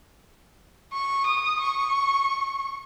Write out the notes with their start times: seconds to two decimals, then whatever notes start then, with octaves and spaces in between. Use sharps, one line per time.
0.93 C#6
1.26 D#6
1.60 C#6